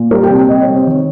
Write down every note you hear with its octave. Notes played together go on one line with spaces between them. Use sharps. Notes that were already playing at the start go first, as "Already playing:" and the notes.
Already playing: A#2
G3 A#4
G5
C3
G5
G3 D#5
C#5
C3
C5
D#3 C#5